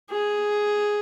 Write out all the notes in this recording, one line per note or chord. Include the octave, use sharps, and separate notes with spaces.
G#4